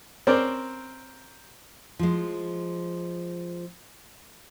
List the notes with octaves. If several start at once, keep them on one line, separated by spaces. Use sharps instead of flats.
C4 C#4 A#4 C5 D5
F3 G#3